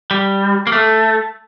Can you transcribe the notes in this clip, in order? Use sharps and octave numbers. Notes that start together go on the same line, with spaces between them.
G3
A#3
A3